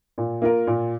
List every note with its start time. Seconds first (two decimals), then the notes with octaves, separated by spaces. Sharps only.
0.18 A#2
0.42 A#3 F4 A#4
0.67 A#2